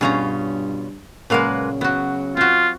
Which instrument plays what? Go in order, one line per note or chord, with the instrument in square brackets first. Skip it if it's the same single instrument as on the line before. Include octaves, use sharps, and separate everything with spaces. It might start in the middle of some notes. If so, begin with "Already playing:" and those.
[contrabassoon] G2 [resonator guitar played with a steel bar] B2 C#4 F4 [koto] G#4 C#5 A#5
[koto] A#2 F#3 F5 [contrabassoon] C#3 [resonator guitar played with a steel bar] G#3 A#3 B4
[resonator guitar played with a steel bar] F#3 [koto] B3 F#4
[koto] C4 F#4 [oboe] F4